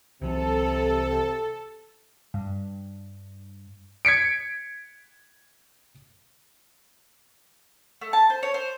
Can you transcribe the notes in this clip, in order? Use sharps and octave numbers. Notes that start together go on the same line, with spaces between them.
C2 C3 E3 F#3 A4
G2
G#6 B6 C#7 D7
A3
A5
C5
C#5
C5